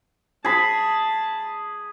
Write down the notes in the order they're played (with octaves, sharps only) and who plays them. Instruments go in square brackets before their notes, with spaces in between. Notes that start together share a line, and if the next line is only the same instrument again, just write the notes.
[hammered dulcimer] G#4 B5 [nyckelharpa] A5